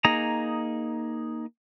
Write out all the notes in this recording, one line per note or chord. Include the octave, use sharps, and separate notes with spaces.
A#3 D#4 G#4 A#5